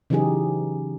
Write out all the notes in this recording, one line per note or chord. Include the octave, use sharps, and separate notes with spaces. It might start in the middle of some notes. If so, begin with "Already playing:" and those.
C#3 E3 F#3 D#4 G4 G#4